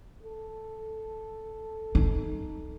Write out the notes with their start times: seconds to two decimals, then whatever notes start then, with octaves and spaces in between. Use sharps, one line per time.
0.23 A4
1.95 D#4